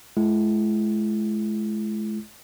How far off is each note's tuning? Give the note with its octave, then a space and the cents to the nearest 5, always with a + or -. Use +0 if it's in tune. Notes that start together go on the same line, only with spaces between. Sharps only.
G#3 +45 E4 +35